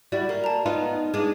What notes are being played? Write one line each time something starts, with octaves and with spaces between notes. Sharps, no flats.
G3 E4 F#4 D5
A#3
A5 A#5
B3 D#4 F4
G#3 D4